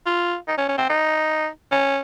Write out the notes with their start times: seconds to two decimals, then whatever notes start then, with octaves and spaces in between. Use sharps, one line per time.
0.06 F4
0.48 D#4
0.58 C#4
0.68 C#4
0.78 C4
0.89 D#4
1.71 C#4